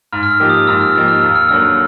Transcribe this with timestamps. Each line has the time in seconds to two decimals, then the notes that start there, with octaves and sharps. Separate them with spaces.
0.13 G#2 F6
0.23 F6
0.31 E6
0.40 F3 A#3 D#4 G4
0.49 D#6
0.67 G#2 E6
0.81 F6
0.96 F3 A#3 D#4 G4 E6
1.08 F6
1.21 D#2 E6
1.35 F6
1.49 D3 F#3 A#3 E6